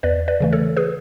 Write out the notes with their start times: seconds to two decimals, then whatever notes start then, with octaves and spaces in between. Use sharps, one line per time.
0.03 E2 B4 D5
0.28 B4 D5
0.40 C#3 E3 A3
0.53 A4 C#5
0.77 G#4 B4